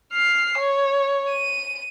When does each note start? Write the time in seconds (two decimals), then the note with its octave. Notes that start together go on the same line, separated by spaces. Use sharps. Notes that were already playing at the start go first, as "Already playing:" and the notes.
0.13 F6 C7
0.58 C#5
1.30 D#7